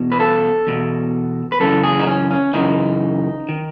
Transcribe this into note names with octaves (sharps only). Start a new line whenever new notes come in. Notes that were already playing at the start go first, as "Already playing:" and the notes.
Already playing: E2 B2
B4
A4
E2 B2
B4
F#2 C#3 E3 A4
G#4
D#4
C#4
C#4
F#2 C#3 E3 D#4
D#3